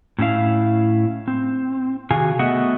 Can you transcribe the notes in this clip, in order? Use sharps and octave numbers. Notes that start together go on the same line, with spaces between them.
A2 C#4 E4 F5
C4
C3 D#3 F#4 G#4 F5 G#5
A3 B3 F#4 D#5 E5 F#5